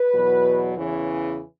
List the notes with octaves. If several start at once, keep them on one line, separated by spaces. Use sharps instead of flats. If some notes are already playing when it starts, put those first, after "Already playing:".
Already playing: B4
E2 B2 F#3
E2 C#3 E3 C#5